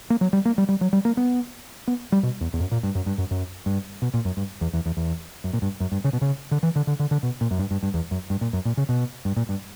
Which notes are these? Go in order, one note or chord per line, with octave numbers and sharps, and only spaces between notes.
A#3
F#3
G3
A#3
G3
G3
F#3
G3
A#3
B3
B3
G3
B2
E2
E2
F#2
A#2
G2
F#2
G2
F#2
F#2
G2
B2
A#2
F#2
G2
E2
E2
E2
E2
F#2
A#2
G2
F#2
G2
C#3
B2
C#3
D3
E3
D3
D3
D3
D3
B2
A#2
F#2
G2
G2
G2
E2
F#2
G2
A#2
F#2
A#2
C#3
B2
G2
A#2
G2